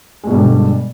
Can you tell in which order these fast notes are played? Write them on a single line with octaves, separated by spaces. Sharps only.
G#3 B2 G2 G3 D3